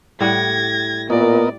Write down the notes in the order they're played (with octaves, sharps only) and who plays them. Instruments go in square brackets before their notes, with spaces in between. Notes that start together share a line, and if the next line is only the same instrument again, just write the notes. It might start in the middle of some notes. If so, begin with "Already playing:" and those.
[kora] A2 G3 F#5 [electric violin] G#6 A#6
[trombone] A#2 [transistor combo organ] B3 A#4 D#5 [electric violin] D5